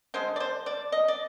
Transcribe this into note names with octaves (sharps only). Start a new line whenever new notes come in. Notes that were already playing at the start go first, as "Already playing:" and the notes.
D3 G#3 C5
D5
C5
D5
D#5
D5